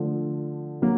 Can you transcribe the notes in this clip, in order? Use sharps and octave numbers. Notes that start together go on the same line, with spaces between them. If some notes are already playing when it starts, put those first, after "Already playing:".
Already playing: D3 F3 A3
F#3 A#3